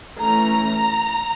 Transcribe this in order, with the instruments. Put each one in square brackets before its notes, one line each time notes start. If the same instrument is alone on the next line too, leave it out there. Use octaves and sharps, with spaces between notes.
[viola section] E3 A3 C#4 A#5